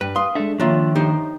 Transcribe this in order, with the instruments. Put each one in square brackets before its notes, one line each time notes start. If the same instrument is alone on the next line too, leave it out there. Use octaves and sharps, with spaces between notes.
[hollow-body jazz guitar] G2 [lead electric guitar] B4
[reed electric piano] F5 D#6 [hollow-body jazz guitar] C6
[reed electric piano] G#3 D4 [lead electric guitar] A4 E5
[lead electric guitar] D#3 D4 [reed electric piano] F3 C#5 E5 [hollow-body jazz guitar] A#3 F4
[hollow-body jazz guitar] D#4 G4 C5